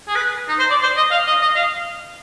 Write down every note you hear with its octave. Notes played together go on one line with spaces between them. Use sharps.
G#4
B4
D#4
C5
D5
C5
D#5
F5
D#5
D#5
F5